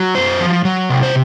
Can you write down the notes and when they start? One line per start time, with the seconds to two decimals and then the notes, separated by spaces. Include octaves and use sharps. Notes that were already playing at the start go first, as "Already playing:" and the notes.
Already playing: F#3
0.15 F#2 C5
0.40 F3
0.65 F#3
0.90 C3
1.03 C5